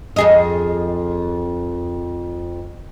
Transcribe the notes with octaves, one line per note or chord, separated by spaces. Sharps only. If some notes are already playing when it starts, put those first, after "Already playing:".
F2 G#4 D#5